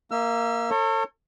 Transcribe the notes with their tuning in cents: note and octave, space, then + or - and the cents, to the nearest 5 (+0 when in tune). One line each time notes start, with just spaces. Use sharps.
A#3 +0 E5 -35 E6 +45
A4 +40 C#5 -25